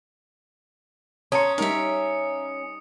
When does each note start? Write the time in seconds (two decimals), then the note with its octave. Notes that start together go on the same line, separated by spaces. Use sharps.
1.32 C#4 A5 A#5 C6 D#6 C#7
1.58 G3 D#4 A#4 E5